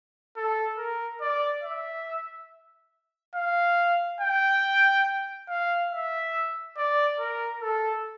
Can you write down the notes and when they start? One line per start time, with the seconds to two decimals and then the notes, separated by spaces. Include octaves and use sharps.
0.36 A4
0.78 A#4
1.21 D5
1.64 E5
3.36 F5
4.21 G5
5.49 F5
5.91 E5
6.77 D5
7.20 A#4
7.62 A4